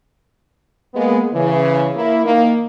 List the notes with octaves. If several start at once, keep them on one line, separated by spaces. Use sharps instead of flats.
G#3 A#3 B3
C#3 E3
A#3 E4
D#3 A#3